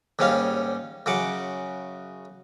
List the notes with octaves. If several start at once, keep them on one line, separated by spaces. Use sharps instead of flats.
D#2 G#2 G3 C#4 F5
F#2 C#3 F#5 D6